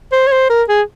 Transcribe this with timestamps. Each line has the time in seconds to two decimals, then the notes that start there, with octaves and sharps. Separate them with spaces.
0.12 C5
0.27 C#5
0.32 C5
0.50 A#4
0.69 G#4